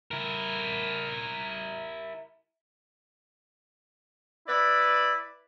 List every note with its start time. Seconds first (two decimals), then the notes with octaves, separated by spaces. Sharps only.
0.11 E4 A#4
4.48 E4 B4 D5